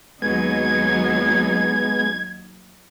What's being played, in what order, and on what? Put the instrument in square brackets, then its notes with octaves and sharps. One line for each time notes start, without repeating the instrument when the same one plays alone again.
[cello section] D#2 F#3 D#4 [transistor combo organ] G#3 B3 [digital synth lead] G#6